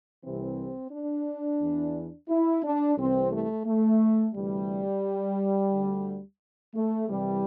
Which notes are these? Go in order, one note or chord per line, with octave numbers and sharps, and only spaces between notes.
C2 C3 E3 C4
D4
E2 E3
E4
D4
C2 C3 E3 C4
A3
A3
D2 C3 E3 G3
D2 D3
A3
C2 C3 E3 G3